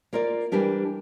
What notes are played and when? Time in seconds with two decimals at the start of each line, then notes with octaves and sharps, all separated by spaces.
0.13 A#3 F4 A#4 D5
0.52 E3 G3 D4 G4 A#4